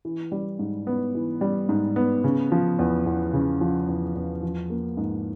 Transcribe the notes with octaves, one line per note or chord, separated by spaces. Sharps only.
E3
G3
G#2
B3
E3
G3
G#2
B3
C#3
F3
E2
E2
C#3
F3
E2
E2
F3
A#3
G#2